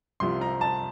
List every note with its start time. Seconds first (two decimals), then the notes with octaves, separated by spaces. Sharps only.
0.20 C2 C3 F3 C6
0.41 A#5
0.61 A5